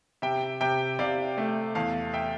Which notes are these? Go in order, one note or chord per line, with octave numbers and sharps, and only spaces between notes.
C3 E5 G5
C3 E5 G5
C3 D5 F5
A3
E2 F5 A5
E5 G5